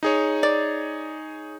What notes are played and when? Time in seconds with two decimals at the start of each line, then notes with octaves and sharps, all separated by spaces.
0.03 D#4 G#4 C#5
0.43 D5